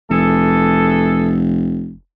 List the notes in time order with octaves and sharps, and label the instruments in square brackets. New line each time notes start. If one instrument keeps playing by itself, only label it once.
[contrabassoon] F1 [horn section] E3 G#4 A4